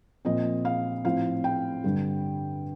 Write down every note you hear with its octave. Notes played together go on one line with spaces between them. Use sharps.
A#2 F3 C4 D#5
F5
A2 F3 C4 F5
G5
G2 D3 G3